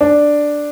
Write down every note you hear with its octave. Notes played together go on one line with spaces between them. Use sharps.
D4